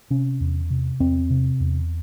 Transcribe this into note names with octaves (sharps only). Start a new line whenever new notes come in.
C3 C#4
E2
C3
E2 C4
C3
E2